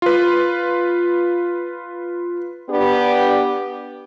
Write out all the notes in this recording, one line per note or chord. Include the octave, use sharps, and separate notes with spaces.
F4 B4
B3 D4 G4